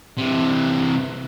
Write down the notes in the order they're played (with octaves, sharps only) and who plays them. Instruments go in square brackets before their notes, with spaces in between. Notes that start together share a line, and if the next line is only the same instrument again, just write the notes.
[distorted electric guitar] C3 E3